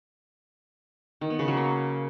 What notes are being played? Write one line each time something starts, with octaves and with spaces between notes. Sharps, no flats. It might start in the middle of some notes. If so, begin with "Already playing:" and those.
D#3
B3
C#3
F#3
A#3